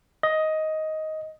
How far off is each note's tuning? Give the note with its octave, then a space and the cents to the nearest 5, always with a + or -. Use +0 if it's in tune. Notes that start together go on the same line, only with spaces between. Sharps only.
D#5 +10